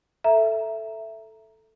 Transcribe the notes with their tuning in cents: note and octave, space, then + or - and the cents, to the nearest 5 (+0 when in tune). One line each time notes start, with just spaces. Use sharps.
A4 +0 E5 +5 A#5 +0